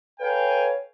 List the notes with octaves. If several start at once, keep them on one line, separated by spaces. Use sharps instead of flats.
A4 B4 C#5 F5 G5 G#5